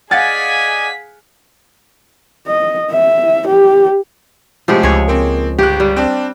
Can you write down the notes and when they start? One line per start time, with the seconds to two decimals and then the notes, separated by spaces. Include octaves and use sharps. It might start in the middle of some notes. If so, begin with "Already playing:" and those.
0.11 G#4 D5 D#5 F5 F#5 G#5 A6 B6
2.47 D#5
2.92 E5
3.47 G4
4.68 A2 C3 F3 G#3 G4
4.83 C#2 G#4 C#5
5.08 A#3 C4
5.59 G1 G4 F#6
5.80 G3
5.96 C4 D4